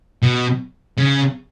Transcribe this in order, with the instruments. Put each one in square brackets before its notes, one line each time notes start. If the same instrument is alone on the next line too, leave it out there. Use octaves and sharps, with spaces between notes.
[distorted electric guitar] B2
C#3